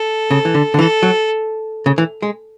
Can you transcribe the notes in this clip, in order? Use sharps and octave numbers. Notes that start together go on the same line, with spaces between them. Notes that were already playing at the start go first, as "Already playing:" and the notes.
Already playing: A4
C#3
E3
D3
D3
E3 A4
F#3
C#3
E3
G#3